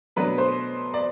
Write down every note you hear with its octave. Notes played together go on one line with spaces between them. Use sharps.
B2 F#3 A3 D4 B4
C5
D5